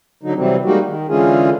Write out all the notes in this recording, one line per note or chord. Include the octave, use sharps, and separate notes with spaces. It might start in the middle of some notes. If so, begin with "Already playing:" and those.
D3 F#3 D#4
C3 E3 F#3 G3 C4
G3 G#3 A#3 D#4 F#4 G4
D#3
D3 E3 G#3 C#4 F4 G#4